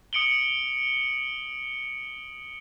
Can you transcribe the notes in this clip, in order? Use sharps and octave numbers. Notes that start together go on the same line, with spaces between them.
D#6 C#7 D7 F#7 G7